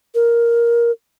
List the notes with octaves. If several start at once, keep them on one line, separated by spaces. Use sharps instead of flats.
A#4